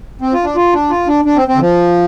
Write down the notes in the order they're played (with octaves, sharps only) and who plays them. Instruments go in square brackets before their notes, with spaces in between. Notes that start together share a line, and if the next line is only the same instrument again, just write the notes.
[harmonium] C4
F4
D4
F4
D4
F4
D4
D4
C4
C4
D3
F3